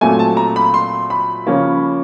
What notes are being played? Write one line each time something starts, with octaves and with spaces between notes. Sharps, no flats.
A#2 F#3 A3 C4 G#5
A5
A#5
B5
C6
B5
C#3 F3 A#3 C#4